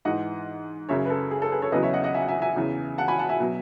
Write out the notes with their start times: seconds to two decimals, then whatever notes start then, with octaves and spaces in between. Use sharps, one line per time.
0.05 G#2 E3 D#5 F#5
0.89 F#2 C#3 F#3 C#5 E5
1.06 B4
1.10 A4
1.31 G#4
1.42 A4
1.51 G#4 B4
1.62 A4 C#5
1.72 E2 C#3 F#3 B4 D#5
1.82 C#5 E5
1.93 D#5 F#5
2.04 D#5 F#5
2.14 E5 G#5
2.22 F#5
2.28 E5 G#5
2.42 E5 G#5
2.56 E2 C#3 E3
2.98 F#5 A5
3.08 G#5 B5
3.19 F#5 A5
3.29 E5 G#5
3.40 B2 F#3